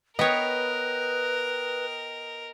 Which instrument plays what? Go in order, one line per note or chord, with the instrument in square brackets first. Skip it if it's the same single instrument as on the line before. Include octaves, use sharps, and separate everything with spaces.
[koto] B3 C#5 [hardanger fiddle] A#4 [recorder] B4 [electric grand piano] D#5 G5